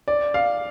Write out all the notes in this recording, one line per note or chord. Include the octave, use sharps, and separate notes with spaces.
D5
F5